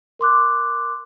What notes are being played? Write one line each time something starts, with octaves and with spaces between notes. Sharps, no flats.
A#4 C6 D6 F#6